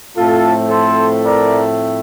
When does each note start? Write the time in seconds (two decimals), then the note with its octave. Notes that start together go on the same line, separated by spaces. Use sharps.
0.14 A2 F3 A3 C4 F4 A4
0.69 A4 C5
1.23 A#4 D5